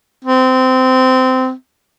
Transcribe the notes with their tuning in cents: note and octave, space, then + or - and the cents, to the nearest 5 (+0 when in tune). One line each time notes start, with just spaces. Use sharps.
C4 -20